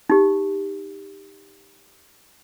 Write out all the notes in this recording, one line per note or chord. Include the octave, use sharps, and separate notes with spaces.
D#4 G4